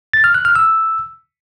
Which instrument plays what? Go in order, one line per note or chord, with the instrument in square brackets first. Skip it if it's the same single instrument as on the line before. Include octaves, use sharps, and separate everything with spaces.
[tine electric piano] A6
F6
F#6
F6
E6